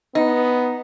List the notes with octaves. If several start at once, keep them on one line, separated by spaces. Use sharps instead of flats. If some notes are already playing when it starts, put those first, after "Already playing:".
B3 D#4